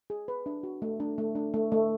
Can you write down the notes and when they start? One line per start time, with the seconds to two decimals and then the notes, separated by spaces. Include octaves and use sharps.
0.10 G#4
0.28 B4
0.46 D4
0.63 F#4
0.82 A3
1.00 D4
1.18 A3
1.35 D4
1.54 A3
1.72 A3